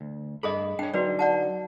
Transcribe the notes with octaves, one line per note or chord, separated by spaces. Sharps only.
D2
G2 G#4 A4 D#5 B5
D4 C#5 G5
D3 F#3 D#4 F#4 B4 D5
D5 F#5 A5